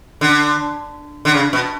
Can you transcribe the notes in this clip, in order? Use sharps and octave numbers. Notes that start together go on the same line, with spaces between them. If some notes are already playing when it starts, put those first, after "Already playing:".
D3
D3
C#3
B2